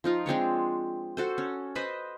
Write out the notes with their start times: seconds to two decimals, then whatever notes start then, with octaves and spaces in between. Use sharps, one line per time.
0.04 F3 D#4 F4
0.26 G#3 C4 D4 C#5
1.17 F#4 A4 C5
1.38 C#4
1.75 B4 C5 D#5 B5